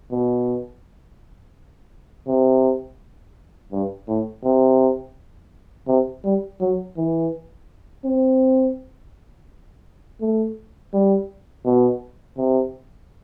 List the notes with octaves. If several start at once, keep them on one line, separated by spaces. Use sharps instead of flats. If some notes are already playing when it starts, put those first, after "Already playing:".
B2
C3
G2
A2
C3
C3
G3
F#3
E3
C4
A3
G3
B2
C3